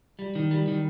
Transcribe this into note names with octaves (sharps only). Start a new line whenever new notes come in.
G3
D#3
G3
D#3